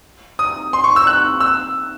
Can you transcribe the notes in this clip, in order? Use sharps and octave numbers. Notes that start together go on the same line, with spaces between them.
D#6
C6
C#6
E6
F#6
E6